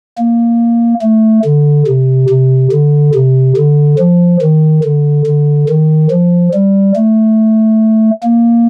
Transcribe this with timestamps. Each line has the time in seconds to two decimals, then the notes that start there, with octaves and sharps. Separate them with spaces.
0.18 A#3
1.02 A3
1.45 D3
1.87 C3
2.30 C3
2.72 D3
3.15 C3
3.57 D3
3.99 F3
4.41 D#3
4.84 D3
5.26 D3
5.68 D#3
6.11 F3
6.54 G3
6.96 A3
8.23 A#3